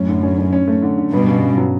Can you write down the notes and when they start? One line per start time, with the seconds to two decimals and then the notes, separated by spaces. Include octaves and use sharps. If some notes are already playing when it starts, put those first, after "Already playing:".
Already playing: F#2 A2 C#4
0.08 D3
0.23 C#4
0.38 C#4
0.53 C#4
0.68 A3
0.82 D3
0.98 D3
1.12 G2 B2 B3
1.28 C#3
1.43 C#3
1.58 F#3